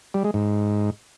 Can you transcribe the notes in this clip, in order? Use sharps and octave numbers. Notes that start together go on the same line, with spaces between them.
G3
G#3
G#2